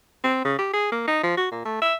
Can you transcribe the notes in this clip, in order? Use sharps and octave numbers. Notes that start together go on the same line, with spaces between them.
C4
C#3
G4
G#4
A#3
D#4
F3
F#4
A#2
A3
E5